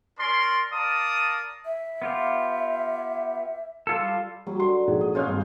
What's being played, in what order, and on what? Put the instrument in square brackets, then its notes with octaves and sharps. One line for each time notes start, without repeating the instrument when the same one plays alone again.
[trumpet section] C#4 A#4 D5 C6
A#4 D5 F5 A5 D#6
[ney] E5
[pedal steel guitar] B3 F4 G4
G3 F4 A4
[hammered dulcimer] F#3 [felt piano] G3
[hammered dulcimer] D3 [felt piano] C6
[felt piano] A#1 G#2 G#4
[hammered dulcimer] D#5
[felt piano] C#4 C#5 F6 [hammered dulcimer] F4 G#4 C5
[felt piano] G#1 G2